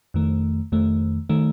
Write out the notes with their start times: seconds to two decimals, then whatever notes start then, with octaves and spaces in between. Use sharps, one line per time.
0.14 F2 D#3 A3
0.72 F2 D#3 A3
1.29 D#3 A3